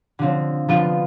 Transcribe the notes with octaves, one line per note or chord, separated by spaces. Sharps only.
D3 F3 C4
D3 F3 B3 F4